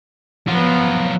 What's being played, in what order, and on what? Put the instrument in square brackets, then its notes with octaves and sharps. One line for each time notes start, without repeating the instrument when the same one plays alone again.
[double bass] F3 B3 [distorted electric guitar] F#3 F4